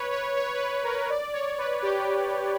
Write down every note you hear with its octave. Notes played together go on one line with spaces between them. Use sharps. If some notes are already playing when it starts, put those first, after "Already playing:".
Already playing: B4 C#5
C#5
C#5
B4
A#4
B4
D5
C#5
B4
G4